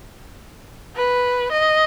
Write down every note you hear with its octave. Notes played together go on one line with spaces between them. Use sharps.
B4
D#5